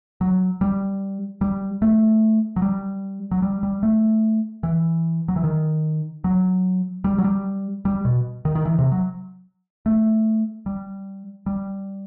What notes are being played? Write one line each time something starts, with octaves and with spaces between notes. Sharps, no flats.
F#3
G3
G3
A3
F#3
G3
F#3
G3
G3
A3
E3
F#3
E3
D#3
F#3
G3
F#3
G3
G3
B2
D#3
D#3
E3
C3
F#3
A3
G3
G3